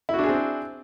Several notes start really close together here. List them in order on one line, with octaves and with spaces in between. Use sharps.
E4 F#4 D4 G#4 C4